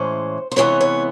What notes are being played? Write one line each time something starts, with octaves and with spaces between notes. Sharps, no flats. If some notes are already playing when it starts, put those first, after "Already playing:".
Already playing: A2 E3 G#3 C#4 C5
C5
C3 E3 G#3 B3 C#5
C#5